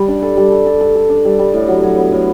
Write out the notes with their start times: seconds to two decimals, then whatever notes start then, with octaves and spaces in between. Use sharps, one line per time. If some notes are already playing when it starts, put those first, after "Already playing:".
Already playing: G3
0.08 D4
0.22 A4
0.37 G3
0.52 A4
0.66 A4
0.81 A4
0.95 A4
1.10 D4
1.25 G3
1.39 G3
1.54 A2
1.68 F#3
1.83 F#3
1.98 B3
2.12 A2